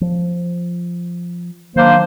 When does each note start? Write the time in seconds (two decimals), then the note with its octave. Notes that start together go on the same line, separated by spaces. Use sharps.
0.01 F3
1.76 D#3 F#3 A#3 D4 C5